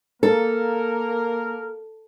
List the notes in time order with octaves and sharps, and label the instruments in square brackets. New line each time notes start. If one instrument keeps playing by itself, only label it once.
[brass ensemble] A#3 A#4 [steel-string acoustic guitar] A4